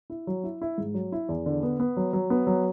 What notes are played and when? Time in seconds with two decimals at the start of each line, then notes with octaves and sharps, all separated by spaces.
0.10 E4
0.27 F#3
0.44 E4
0.61 E4
0.78 G#2
0.94 F#3
1.12 E4
1.29 E2
1.46 D3
1.63 B3
1.80 B3
1.97 F#3
2.13 F#3
2.30 B3
2.47 F#3